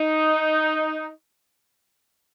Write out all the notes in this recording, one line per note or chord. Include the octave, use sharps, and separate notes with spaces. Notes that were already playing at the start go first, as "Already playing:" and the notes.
Already playing: D#4